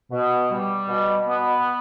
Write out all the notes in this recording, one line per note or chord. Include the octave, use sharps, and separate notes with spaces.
B2
G3
B2
B3